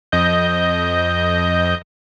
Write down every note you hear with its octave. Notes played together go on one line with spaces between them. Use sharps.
F2 D#5 G6